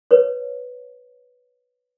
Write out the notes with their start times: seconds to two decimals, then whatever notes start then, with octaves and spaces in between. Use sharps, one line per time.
0.11 B4 C#5